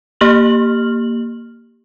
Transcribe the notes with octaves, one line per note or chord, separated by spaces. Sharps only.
A#3 G4 F6 F#7